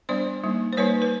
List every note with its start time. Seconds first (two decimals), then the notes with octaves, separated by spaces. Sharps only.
0.09 G3 B3 D4 C5 D5
0.44 G3 A#3 D#4
0.73 C5
0.77 G3 A#3 D#4 B4 C#5
1.02 B4